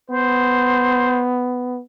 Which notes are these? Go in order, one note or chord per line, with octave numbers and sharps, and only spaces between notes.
B3 C5